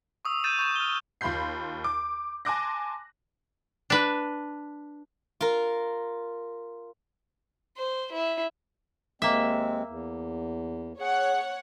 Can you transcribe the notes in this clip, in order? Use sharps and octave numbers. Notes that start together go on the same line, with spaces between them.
C#6 D#6 E6
G6 A6 D#7 E7
C#6 G6 A6 D#7 E7
F6 G7
D#2 F4 B5 C6 G6 C7
D6
G#5 A5 C6 D6 F#6 A#6
D4 B4
F4 A#4
C5
E4
D#2 G#3 A#3 C4 E5
E2
G#4 C#5 F#5